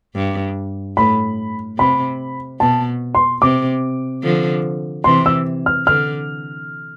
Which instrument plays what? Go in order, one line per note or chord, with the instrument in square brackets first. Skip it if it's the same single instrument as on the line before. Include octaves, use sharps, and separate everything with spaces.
[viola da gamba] G2
[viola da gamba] A2 [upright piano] B5
[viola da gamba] C3 [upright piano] B5
[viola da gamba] B2 [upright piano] A5
[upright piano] C6
[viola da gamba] C3 [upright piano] D6
[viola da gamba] D3 F3
[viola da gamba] C3 E3 [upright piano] C6
[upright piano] E6
F6
[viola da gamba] D3 [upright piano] F6